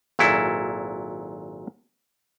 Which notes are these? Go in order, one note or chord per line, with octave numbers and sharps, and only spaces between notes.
G#1 A#2 F#3 E4 A4